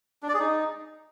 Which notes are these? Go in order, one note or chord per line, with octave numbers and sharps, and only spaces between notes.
D4
D5
G#4
D#4